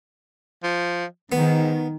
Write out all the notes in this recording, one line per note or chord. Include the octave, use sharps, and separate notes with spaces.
F3
G#2 D#3 B3